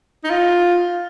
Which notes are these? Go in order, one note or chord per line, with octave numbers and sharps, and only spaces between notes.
D#4
F4